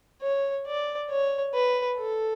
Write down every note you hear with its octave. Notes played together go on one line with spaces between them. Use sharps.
C#5
D5
C#5
B4
A4